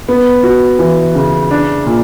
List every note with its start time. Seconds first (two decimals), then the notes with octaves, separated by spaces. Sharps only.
0.09 B3
0.43 F#4
0.79 E3
1.15 C#3
1.51 D4
1.86 A#2